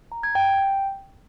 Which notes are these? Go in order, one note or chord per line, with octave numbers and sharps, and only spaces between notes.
A#5
G#6
G5